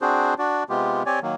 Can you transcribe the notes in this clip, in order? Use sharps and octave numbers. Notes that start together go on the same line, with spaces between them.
C4 D4 F#4 G#4 C5
D4 F#4 D5
C3 G#3 B3 F4 G4
C4 G4 C#5 D5 G#5
D#3 F#3 A#3